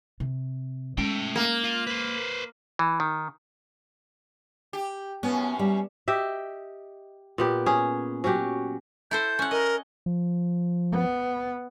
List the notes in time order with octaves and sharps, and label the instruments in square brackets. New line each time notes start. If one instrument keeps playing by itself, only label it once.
[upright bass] C3
[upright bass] G#3 C#4 [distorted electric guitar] A3 G5
[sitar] A#3
[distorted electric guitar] F4
B4 C5
[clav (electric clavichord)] E3
D#3
[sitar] G4
[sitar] F#2 A2 C#4 [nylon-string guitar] B3
[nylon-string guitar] G3
[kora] G4 D#5 E5
A#2 B3 G4
C#4 G#4
F#3 C#4 F#4 G4
[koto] E4 A4 C5 [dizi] G6
[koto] C#4 F#5
[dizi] A#4 [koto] D#5
[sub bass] F3
[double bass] B3